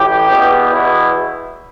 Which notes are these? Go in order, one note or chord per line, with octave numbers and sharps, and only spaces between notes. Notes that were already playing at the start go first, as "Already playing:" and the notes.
Already playing: A1 A2 E3 G4
E2 B2
E2 B2 E4